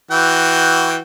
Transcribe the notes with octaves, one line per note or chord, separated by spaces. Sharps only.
E3 F#4 G5